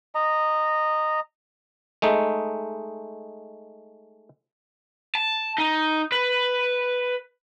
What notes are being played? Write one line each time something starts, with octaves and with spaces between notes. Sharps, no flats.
D#5 A#5
G#3 A3 D#4
A5
D#4
B4